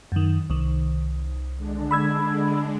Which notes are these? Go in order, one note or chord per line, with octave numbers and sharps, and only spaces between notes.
F#2 D#3
C2 D#3
D3 G#3 D4
B5 E6 G#6